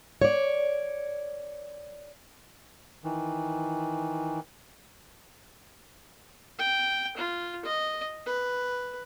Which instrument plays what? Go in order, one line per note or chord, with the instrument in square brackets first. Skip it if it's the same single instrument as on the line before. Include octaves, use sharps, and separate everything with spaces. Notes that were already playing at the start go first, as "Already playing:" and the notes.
[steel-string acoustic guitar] C#5 D5
[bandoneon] D#3 E3
[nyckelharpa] G5
F4
D#5
B4